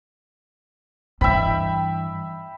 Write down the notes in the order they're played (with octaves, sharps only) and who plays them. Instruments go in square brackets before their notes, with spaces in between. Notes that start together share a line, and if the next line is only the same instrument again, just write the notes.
[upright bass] G2 E3 [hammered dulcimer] E5 G5 B5